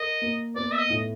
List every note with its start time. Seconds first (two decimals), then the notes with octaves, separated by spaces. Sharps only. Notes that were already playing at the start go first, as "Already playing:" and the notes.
Already playing: A#4 D#5
0.22 A#3
0.56 B3 D5
0.72 E5
0.79 D#5
0.90 A2